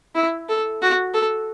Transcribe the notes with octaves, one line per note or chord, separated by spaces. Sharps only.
E4
A4
F#4
A4